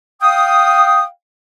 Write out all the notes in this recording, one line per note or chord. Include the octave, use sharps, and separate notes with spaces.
F5 G5 D#6